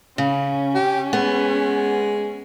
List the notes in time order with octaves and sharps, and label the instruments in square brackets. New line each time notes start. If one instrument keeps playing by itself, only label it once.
[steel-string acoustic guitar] C#3 [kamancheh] C#4
[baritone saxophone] G4
[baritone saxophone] G#3 [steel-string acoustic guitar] B3